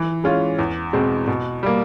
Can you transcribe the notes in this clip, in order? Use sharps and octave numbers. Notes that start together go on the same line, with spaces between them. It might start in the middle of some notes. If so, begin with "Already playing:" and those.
Already playing: E3
G#3 C#4 F4
E2
B2 G#3 C4
B2
G3 A#3